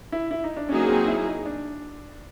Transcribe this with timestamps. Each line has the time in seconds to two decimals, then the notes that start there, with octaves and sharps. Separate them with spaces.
0.12 E4
0.31 E4
0.44 D#4
0.57 D4
0.69 F#3 A#3 C#4 D#4 G#4
0.88 C4
1.07 E4
1.26 D#4
1.45 D4